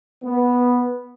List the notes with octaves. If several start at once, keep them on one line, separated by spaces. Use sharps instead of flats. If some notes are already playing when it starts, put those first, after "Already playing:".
B3